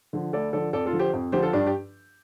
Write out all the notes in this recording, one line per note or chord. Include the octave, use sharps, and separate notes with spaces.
D3 F3
D2 A4 D5
D3 F3 A4 D5
F2 A4 D5
F4 A4
D3 F3
G4 C5
F2
D3 F3 G4 C5
F4 A4
G2 D4 G4
G4